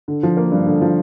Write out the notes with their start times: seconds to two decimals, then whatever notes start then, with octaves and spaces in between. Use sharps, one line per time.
0.08 D3
0.23 F3
0.37 A#3
0.52 G2
0.67 D3
0.81 F3